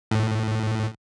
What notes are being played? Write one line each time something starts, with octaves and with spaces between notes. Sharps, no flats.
A2